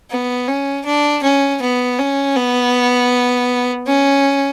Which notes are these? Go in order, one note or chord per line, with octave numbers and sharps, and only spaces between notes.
B3
C#4
D4
C#4
B3
C#4
B3
C#4